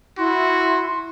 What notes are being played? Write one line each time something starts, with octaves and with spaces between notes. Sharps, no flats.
E4 F#4 C6